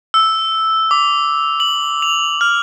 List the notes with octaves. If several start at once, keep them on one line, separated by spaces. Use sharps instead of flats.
E6
D6
F#7
F7
F6